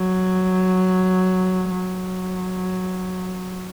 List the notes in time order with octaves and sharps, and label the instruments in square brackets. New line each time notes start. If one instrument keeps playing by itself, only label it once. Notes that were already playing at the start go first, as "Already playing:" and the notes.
Already playing: [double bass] F#3
F#3